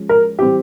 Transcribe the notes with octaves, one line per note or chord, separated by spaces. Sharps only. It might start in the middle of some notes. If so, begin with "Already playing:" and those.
Already playing: F3 G#3 C#4
A#4
E3 G3 C4 G4